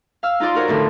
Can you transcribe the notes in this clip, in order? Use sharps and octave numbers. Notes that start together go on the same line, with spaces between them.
F5 E6 F6
D#4 F4 C5 D5 C6
F#4 A#4 C5 C#5
F2 A2 D3